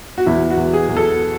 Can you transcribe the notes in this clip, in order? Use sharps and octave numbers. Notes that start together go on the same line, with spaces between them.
F#4
E2 E4
F#4
E2
G#4
E2
A4